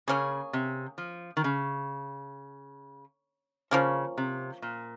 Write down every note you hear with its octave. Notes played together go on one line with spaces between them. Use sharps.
C#3 A#3 C#4 G#4
C3
F3
D#3
C#3
C#3 F3 A#3 C#4
C3
A#2